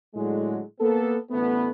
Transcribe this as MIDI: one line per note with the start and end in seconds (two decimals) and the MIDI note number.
0.15 0.60 45
0.15 0.60 50
0.15 0.60 54
0.15 0.60 56
0.79 1.15 58
0.79 1.15 59
0.79 1.15 69
1.31 1.70 33
1.31 1.70 38
1.31 1.70 57
1.31 1.70 59